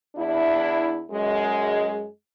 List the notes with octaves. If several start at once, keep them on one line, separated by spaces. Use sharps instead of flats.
E2 D4 E4
F#2 G#3